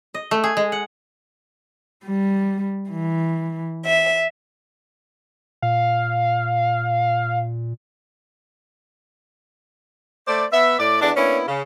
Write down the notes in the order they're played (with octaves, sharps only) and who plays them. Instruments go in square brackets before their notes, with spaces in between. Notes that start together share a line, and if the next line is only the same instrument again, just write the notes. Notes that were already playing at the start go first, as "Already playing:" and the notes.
[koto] D#5
A3
G#4
G#3
F#5
[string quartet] G3
E3
E5
[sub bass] A#2 [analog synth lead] F5
[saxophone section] A3 C5 D5
B3 E5
A2 D5
E2 D4
A#3 B3 C#4 D4 E4
C#3